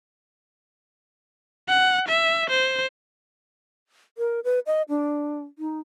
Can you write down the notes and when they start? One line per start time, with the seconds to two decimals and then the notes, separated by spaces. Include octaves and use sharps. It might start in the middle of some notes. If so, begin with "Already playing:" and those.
1.68 F#5
2.08 E5
2.50 C5
4.18 A#4
4.44 B4
4.66 D#5
4.89 D4
5.59 D#4